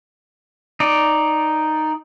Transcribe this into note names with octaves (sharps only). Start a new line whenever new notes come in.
D#4 D5